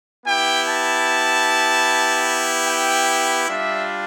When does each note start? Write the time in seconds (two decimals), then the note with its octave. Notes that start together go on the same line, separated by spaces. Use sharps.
0.24 B3 E4 G4 G5
0.65 A5
2.66 G5
3.47 G3 D4 F4 E5